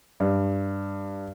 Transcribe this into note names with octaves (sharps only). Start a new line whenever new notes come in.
G2